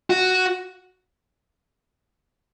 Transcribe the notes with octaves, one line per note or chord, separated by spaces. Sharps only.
F#4